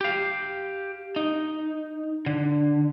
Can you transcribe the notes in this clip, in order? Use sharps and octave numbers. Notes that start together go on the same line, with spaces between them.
G4 F5
D#4
D3